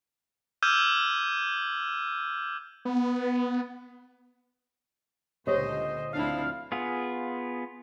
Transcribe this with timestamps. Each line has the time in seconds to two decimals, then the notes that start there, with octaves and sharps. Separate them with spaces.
0.62 D6 E6 F6 G6 G#6 D#7
2.85 B3
5.47 C#2 A#2 D3 G4 A4 C5 C#5 D#5
6.13 D2 F3 C4 D4 E4 F5
6.72 B3 F4 G#4